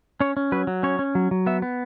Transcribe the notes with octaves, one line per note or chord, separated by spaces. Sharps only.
C#4 C#5
C#4
F#3 B4
F#3
C#4 C#5
C#4
F#3
F#3
B3 E5
B3